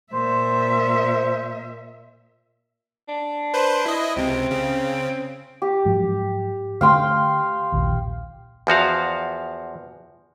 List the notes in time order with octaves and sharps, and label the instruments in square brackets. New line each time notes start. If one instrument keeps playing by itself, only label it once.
[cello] A#2 E5 [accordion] C5
[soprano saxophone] D4
[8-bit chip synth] B4 C5
E4 D#5
[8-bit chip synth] C#2 C3 [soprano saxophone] C4
[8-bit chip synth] C#3
[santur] G4
[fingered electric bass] G#2 F3 F#3
[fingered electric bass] D3 A3 [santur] F5 G5 C6
[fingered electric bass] A#1 D#2
[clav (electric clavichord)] E2 F3 F#4 F5